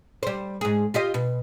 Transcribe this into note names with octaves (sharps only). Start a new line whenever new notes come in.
G3 C5
G#2 G#4
F4 G4 D#5
B2